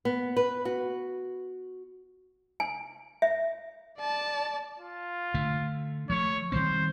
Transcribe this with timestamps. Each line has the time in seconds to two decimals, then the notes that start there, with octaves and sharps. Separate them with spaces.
0.05 B3
0.36 B4
0.65 F#4
2.60 G#5
3.22 E5
3.98 D5 A5
4.79 F4
5.34 D3 A3
6.10 F3 A3 C#5
6.52 D#3 G3 C4 C5